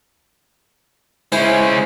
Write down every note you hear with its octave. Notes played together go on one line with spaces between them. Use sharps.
G#3 C#4 E4 C5